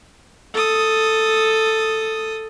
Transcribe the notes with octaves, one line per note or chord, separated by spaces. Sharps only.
A4 D#6